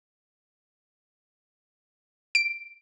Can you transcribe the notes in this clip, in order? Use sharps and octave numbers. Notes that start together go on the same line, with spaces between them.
D7